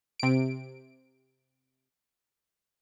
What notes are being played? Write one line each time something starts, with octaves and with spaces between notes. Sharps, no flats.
C3 D7